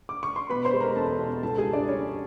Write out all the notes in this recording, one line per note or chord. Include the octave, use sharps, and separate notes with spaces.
D6
C#6
C6
B2 B4 B5
C5 C6
G#3
A#4 A#5
E2 A4 A5
B2
C#2 A4 A5
G#4 G#5
C#2
D4 D5
G3 C#4 C#5